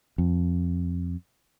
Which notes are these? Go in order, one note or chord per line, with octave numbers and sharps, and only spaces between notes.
F2